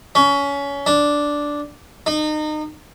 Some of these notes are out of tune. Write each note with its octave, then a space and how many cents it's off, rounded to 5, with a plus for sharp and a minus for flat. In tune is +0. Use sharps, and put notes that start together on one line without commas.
C#4 +25
D4 -5
D#4 -30